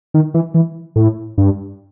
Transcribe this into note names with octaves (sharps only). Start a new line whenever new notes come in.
D#3
E3
E3
A2
G2